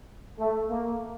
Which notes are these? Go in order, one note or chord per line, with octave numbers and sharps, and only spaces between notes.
A3
A#3